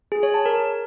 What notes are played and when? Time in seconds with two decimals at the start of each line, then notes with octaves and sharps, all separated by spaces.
0.12 G#4
0.23 C#5
0.34 A5
0.46 A#4